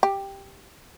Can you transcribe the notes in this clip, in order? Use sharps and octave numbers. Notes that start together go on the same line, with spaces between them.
G4